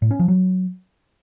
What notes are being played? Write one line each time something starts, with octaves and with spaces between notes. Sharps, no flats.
A2
C#4
F3
F#3